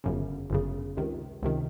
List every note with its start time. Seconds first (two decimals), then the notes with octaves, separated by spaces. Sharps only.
0.04 G1 F#2 C#3
0.50 G1 F#2 C#3
0.97 C#2 C3 D#3
1.43 C#2 C3 D#3